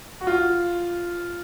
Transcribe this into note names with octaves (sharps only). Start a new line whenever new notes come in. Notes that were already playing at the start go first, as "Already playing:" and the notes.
F#4
F4